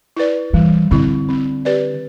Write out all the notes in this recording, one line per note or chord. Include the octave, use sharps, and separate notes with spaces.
E4 B4 D5
E3 G3
D3 C4 E4
C4
G4 B4 D5